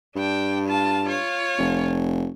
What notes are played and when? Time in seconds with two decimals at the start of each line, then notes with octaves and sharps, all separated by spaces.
0.16 G2 D4 G5
0.68 F4 A5
1.05 F4 C#5
1.59 F1